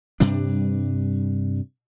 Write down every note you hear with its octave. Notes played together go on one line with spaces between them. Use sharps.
G2 C3 G3 D4